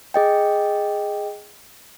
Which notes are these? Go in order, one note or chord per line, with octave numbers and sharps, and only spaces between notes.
G#4 D#5 G5